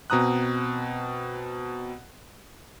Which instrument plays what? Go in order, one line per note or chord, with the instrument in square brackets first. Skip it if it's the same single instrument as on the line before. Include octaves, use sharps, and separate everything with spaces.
[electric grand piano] B2 C4 A#5 D#6 F#6